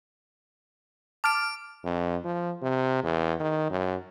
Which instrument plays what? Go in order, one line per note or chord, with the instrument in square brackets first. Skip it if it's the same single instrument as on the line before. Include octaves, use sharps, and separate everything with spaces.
[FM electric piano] A5 F6 [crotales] D6 D7
[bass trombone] F2
F3
C3
E2
D#3
F#2